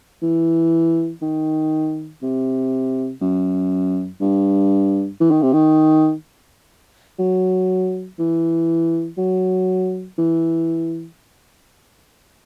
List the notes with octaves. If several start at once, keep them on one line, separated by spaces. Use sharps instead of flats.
E3
D#3
C3
F#2
G2
E3
D#3
C3
D#3
F#3
E3
F#3
E3